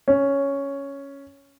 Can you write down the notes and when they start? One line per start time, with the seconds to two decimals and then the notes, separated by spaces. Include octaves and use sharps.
0.08 C#4